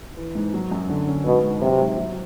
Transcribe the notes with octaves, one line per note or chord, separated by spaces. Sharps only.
E3
G#2
F#3
F#2
D3
C#4
G#2 B2
G#2
C3 F#3
G#2
F#3